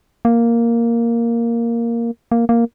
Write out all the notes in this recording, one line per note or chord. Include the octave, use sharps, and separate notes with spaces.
A#3
A#3
A#3